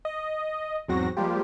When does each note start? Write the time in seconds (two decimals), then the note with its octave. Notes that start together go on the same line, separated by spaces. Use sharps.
0.05 D#5
0.88 E2 G#2 F#3 C4 F#4 A#6
1.17 F3 G3 G#3 A#3 F4 G4